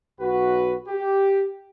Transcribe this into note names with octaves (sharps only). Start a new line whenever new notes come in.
B1 F#4 B4
G4